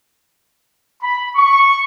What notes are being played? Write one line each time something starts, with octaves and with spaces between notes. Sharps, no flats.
B5
C#6